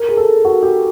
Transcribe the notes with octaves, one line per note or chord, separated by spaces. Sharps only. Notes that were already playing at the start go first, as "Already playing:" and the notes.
Already playing: A#4
G#4
A4
F#4
G4